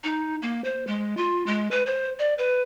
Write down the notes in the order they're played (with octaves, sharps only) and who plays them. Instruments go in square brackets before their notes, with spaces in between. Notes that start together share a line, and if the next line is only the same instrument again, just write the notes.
[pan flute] D#4
A#3
C5
G#3
F4
G#3
B4
C5
D5
B4